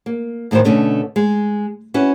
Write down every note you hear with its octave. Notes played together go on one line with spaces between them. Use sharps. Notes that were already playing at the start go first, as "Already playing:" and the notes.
A#3
D2 A2 D#3 E3 C5
B2 D3 A3 C#4
G#3
C#4 E4 F#4 B4